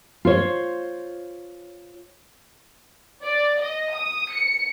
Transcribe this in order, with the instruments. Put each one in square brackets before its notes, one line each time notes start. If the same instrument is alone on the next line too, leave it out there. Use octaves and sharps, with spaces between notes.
[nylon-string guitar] F4 C5 C#5
[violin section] D5
D#5
D#6
C#7